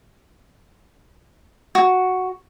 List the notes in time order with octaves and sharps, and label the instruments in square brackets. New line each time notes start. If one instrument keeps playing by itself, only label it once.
[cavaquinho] F#4